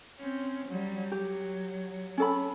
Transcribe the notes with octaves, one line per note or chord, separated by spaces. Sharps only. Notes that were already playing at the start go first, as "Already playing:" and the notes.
C4 C#4
F#3 G3
F#3 G4
C#4 A4 B5